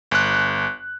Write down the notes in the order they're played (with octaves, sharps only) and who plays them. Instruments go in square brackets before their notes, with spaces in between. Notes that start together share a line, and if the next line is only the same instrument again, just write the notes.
[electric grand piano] G1 F#6